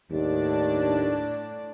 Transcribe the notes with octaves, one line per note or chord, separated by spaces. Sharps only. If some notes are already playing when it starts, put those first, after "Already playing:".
D#2 A2 D4